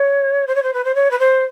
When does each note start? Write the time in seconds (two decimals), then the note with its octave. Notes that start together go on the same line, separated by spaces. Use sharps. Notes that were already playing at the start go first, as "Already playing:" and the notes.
Already playing: C#5
0.47 C5
0.55 C#5
0.62 C5
0.73 B4
0.84 C5
0.95 C#5
1.11 B4
1.19 C5